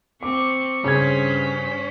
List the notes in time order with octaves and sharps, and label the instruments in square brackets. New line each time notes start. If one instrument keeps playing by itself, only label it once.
[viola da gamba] C4 [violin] C#6 [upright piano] D6
[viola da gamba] G2 [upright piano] C#3 G#6 [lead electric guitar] C#4 [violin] C5 B6